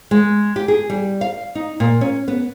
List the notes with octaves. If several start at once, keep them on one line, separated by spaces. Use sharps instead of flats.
G#3
G4
G#4
G3
F5
D#4
A#2
C#4
B3